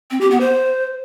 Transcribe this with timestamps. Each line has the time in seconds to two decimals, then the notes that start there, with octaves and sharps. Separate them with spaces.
0.11 C4
0.21 G4
0.31 B3
0.40 C5